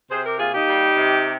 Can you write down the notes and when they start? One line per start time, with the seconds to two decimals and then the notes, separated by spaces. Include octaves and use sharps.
0.11 C3 G#4 C5
0.25 G4 A#4
0.39 A#3 F4 G#4
0.54 D#4 G4
0.68 G3
0.96 C3